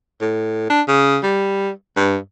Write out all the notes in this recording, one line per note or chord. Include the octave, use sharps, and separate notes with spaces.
A2
D4
C#3
G3
G2